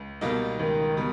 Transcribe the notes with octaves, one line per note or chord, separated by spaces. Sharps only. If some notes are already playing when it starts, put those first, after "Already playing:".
Already playing: C#2
B2 G3 A#3 D#4
C#2 D#3
B2 G3